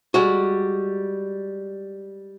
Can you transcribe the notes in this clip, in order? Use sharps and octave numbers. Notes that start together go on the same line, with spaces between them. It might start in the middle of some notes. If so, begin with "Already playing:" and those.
G3 G#3 F#4